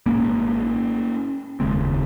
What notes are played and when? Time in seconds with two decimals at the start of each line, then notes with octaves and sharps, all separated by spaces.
0.06 G#1 G#2 A#3 C#4
1.60 F1 D#2 C#3 G#3 C4